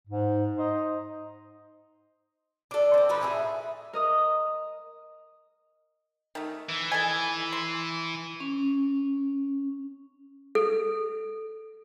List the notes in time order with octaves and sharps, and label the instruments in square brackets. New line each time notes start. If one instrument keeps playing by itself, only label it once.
[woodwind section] G#2
D#4 C5 D#5
[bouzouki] D4 A4
C4 A4
F3 D#4 B4
A2 G#4 E5
[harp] A#4 D#5 D#6
[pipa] D#3 A3
[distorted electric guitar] E3
[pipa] A4 D#5 G#5
C6
[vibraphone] C#4
[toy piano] A4